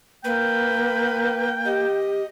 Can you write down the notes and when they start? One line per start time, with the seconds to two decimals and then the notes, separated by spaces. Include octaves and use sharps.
0.24 A#3 B4 G5
1.65 G4 D#5